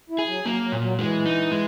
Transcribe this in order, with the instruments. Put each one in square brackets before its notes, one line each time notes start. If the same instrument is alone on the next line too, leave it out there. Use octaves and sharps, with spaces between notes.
[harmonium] E4
[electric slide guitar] G#4
[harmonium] F#3
[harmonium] F#3 [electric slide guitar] A#3
[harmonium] F#3
[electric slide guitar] A#2
[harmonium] F#3
[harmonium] E3 [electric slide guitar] G#3
[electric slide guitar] D#4
G#3